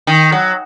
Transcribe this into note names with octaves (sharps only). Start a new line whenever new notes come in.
D#3
F#3